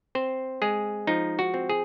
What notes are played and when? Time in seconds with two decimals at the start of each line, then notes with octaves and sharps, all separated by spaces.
0.15 C4 C5
0.62 G#3 G#4
1.07 F3 D#4
1.39 F#4
1.54 C4
1.69 G#4